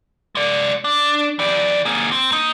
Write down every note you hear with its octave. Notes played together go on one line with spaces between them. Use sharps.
G#3 D5
D4
E3 D5
A#3 G#4
C4
A#3 D#4